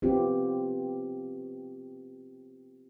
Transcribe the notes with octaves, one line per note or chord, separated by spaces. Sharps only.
B3 C4 F4 G4